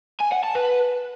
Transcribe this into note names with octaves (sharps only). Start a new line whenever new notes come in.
G#5
F#5
A5
B4